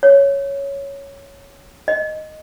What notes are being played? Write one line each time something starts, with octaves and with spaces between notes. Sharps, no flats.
C#5
D#5